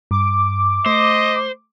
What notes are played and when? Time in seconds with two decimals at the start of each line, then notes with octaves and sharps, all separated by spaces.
0.11 G2 D6
0.86 A3 C5 D#5